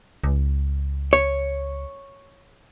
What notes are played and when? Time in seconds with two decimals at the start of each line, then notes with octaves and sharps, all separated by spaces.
0.24 C#2
1.13 C#5